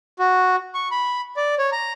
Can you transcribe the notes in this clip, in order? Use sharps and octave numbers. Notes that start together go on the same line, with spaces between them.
F#4
C#6
B5
D5
C#5
A#5